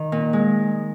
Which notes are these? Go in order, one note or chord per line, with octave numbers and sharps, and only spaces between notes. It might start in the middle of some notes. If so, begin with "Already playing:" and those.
Already playing: D#3
A#2
G#3